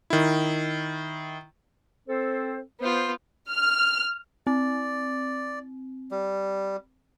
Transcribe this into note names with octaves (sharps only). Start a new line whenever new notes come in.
D#3 E4
C4 A4 C5
B3 F4 C5
F6
C4 D5
G3